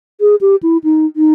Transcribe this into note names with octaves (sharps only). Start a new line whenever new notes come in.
G#4
G4
E4
D#4
D#4